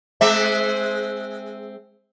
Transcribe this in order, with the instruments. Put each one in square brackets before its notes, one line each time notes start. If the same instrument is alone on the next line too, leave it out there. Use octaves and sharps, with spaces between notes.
[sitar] G#3 C4 E5